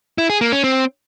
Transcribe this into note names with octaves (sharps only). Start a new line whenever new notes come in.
E4
G#4
A#3
C#4
C4